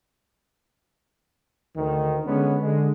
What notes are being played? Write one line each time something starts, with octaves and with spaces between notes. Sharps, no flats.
D2 D#3
D3 G#3 B3 C#4
D3 G#3